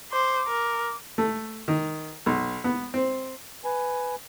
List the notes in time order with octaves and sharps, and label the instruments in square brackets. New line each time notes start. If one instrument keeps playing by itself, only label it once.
[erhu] C5 [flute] D6
[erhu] A#4
[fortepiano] A3
D#3
B1
B3
C4
[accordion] B4 G#5